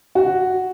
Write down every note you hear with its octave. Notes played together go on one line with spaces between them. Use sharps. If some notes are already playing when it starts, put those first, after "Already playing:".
F#4